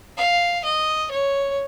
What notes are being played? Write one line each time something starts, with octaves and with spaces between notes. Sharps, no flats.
F5
D#5
C#5